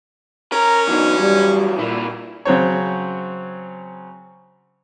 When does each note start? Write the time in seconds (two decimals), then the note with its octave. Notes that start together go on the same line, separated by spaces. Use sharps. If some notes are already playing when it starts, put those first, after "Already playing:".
0.52 C#4 A#4
0.88 E3 F#3 B3 D4 D#4
1.18 G3
1.79 A#2 D3 E4
2.45 C#3 F#3 C4 C#5